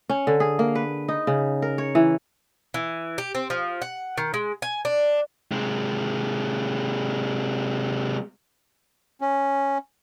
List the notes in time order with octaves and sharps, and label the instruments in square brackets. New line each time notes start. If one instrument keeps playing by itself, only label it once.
[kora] C#4
D3
G#4
A#3
B4
D#4
C#3
A#4
C#5
E3
[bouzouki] E3
G4
C4
F3
F#5
D#3
G#3
G#5
D4
[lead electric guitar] C3 G#3
[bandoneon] C#4